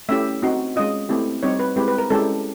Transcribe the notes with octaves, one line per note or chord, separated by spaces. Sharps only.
A3 C#4 E4 G4 E5
C4 D#4 F#4
G#3 C#4 F4 D#5
A3 C4 E4 G4
G3 C4 D#4 G4 C#5
B4
G#3 C4 E4 G4 B4
B4
A#4
G#3 C#4 E4 G4 A4